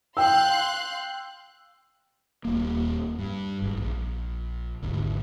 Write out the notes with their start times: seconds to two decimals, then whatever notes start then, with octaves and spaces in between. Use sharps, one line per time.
0.17 F5 G5 C6 E6 F#6
2.45 D#1 A#3
3.19 G2
3.62 G#1
3.77 A#1
4.82 G#1 D2